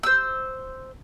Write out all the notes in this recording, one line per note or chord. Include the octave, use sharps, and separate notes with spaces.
C5 E6